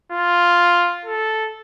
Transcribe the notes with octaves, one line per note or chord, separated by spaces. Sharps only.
F4
A4